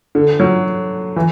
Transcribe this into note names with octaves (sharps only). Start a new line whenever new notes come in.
D3
F#3
E3